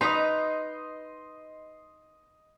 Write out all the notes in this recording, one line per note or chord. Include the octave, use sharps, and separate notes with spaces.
D#4 B4 D#5 A#5 C6